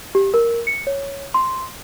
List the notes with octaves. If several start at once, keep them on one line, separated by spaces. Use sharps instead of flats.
G4
A#4
C#7
C#5
C6